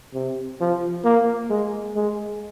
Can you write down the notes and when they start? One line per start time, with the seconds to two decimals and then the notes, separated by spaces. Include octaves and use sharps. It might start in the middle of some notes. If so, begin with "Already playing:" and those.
0.14 C3
0.60 F3
1.05 A#3
1.50 G#3
1.96 G#3